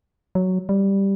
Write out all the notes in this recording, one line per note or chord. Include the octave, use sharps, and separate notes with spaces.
F#3
G3